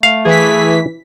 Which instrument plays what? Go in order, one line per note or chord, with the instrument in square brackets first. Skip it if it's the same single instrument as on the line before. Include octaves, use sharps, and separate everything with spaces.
[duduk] A3 [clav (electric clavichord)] F5
[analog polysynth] E3 B6 [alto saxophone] G#4